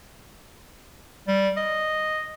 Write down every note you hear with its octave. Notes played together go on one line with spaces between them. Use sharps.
G3
D#5